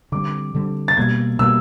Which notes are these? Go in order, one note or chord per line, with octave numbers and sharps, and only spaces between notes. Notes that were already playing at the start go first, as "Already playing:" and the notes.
D3 G3 C4 D6
D3 G3 C4
A6
B2 G3 A#3 G#6
B2 G3 A#3 E6